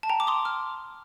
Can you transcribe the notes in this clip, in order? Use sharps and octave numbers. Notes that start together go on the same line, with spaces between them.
A5
G5 A#5
D6
C6 D#6
D6 F6